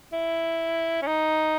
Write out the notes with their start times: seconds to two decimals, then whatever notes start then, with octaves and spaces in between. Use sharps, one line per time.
0.13 E4
1.02 C#4
1.07 D#4